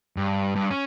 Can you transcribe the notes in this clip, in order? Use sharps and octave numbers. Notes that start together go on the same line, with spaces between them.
G2
G2
C#4